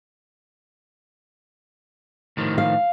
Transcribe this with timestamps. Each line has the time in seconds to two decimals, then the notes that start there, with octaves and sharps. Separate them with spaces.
2.37 A2 D#3 F3
2.58 F5